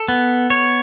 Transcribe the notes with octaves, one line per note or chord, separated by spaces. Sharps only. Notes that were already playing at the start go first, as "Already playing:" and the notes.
Already playing: A4
B3
C#5